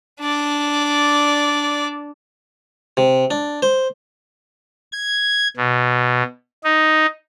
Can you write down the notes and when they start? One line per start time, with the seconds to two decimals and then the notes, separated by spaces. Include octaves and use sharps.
0.21 D4 D5
2.97 C3
3.31 D4
3.62 C5
4.92 G#6
5.57 B2
6.64 D#4